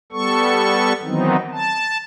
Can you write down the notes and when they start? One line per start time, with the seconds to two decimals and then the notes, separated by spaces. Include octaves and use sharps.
0.12 G3 B3 A4 C#6
1.03 D#3 E3 F#3 B3 C4 D#4
1.52 A5